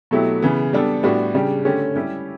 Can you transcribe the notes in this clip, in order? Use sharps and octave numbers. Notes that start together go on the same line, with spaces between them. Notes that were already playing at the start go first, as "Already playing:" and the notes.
B2 F#3 A3 E4 G4
C#3 E3 B3
G3 B3 D4 A4
A2 G3 B3 D4 F#4
C#3 G3 D4 G4
D3 A3 C#4 G4
G3 C#4 E4 G4